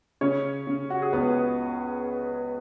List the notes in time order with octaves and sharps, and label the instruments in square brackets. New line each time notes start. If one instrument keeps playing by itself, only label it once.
[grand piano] C#3 C#4 C#5
C#3
F#4
G#4
C#2 B3 B4